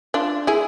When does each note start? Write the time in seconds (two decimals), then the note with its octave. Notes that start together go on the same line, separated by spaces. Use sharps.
0.14 D4 F4
0.47 E4 G#4